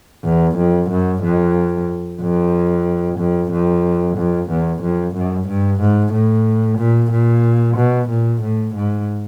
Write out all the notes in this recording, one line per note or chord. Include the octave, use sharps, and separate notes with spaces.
E2
F2
F#2
F2
F2
F2
F2
F2
E2
F2
F#2
G2
G#2
A2
A#2
A#2
B2
A#2
A2
G#2